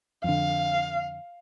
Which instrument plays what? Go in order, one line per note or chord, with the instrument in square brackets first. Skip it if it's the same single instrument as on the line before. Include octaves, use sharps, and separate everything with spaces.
[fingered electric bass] F2 D3 [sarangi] F5